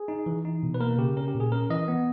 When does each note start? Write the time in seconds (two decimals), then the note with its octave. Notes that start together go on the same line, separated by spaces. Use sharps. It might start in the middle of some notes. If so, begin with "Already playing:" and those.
Already playing: G#4
0.08 D#4
0.26 E3
0.45 D#4
0.63 B2
0.74 B4
0.80 A#3 A#4
0.98 C#3 G4
1.17 C#4 A#4
1.28 G4
1.35 A#2
1.40 G#4
1.52 C#4 A#4
1.70 E3 D#5
1.88 B3